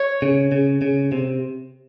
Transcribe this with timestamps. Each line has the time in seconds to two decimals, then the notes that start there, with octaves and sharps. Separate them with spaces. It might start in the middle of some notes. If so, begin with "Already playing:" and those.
Already playing: C#5
0.22 C#3
0.52 C#3
0.82 C#3
1.12 C3